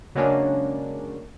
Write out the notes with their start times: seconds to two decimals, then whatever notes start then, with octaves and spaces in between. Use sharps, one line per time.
0.15 C#3 F#3 G#3 A#3 C#4 D4